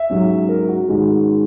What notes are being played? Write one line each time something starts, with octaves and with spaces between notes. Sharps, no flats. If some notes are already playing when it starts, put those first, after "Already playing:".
Already playing: E5
G#2 F#3 C#4
A#4
F#4
G#2 D#3 G#3 C#4